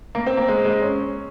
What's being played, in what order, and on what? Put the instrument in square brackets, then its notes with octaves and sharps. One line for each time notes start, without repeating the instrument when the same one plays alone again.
[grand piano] A#3
C4
A#3
G#3
G#3
C#4